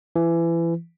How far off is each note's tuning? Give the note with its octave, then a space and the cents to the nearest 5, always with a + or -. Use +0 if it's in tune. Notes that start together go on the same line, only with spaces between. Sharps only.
E3 +25